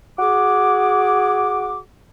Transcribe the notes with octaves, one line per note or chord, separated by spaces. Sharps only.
F#4 G#4 D6